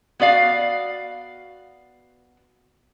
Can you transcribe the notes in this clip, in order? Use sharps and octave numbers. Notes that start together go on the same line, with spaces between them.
B3 F#4 D5 F5